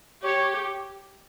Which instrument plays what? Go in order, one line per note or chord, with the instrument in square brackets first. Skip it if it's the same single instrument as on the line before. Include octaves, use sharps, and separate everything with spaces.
[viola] G4 [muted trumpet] C#5